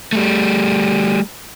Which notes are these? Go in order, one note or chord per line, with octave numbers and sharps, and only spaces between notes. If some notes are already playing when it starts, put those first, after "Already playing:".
G3 A3